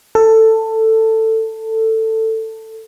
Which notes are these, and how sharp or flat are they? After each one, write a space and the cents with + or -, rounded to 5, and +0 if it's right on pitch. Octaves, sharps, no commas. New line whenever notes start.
A4 +15